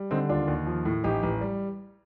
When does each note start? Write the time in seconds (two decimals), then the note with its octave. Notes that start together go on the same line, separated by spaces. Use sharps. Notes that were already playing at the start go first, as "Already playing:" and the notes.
Already playing: G3
0.11 D3 C4 D#4
0.29 D#2 D4 F4
0.48 D#2
0.66 F3
0.85 A2
1.04 A1 D#4 G4
1.23 A1
1.41 G3